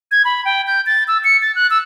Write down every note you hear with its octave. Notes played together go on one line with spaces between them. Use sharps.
G#6
B5
G5
G6
A6
E6
C#7
A6
F#6
E6